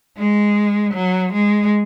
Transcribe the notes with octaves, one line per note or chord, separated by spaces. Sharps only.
G#3
F#3
G#3